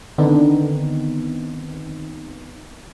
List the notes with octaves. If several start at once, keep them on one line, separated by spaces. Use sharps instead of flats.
D3 D#3 B3 C4 D#4